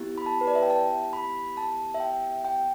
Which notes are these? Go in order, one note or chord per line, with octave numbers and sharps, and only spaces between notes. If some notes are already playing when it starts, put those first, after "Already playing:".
Already playing: B3 E4 G4
B5
A5
B4
D5
E5
G5
A5
B5
A5
E5
G5
G5